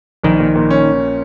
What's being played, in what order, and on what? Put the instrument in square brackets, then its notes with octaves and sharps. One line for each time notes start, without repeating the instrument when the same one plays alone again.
[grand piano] A#1 [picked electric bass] D#3
[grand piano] A#2
A#2
C#4